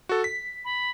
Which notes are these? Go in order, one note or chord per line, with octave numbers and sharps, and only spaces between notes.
F#4 A4
B6
B5